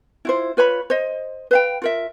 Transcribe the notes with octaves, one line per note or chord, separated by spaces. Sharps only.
E4 F4 C5
F4 B4 C#5 B5
C5 D#5
B4 F5 G5
F4 A#4 E5